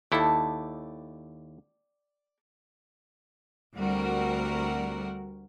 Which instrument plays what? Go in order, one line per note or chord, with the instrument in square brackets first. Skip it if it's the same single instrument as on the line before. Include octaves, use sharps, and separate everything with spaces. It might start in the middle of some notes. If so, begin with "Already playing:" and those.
[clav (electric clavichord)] D#2 E4 A4 [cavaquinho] D5 G5 A5
[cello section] D2 G3 C4 F#4 A#4